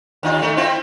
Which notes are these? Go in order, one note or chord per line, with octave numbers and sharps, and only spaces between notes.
D#2 D#4 F4
A3 D#4
C4 E4 F4